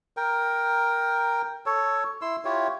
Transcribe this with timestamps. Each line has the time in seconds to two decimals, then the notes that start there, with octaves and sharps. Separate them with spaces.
0.17 A#4 G5
1.66 A4 C#5
2.22 E4 C6 E6
2.45 E4 F4 G4 C#5